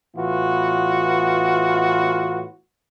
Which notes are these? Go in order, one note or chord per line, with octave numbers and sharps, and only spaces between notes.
A2 E3 B3 F4 F#4